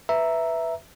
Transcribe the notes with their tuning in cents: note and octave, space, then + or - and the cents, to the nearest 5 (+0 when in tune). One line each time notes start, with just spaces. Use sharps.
B4 +0 E5 +0 A#5 +0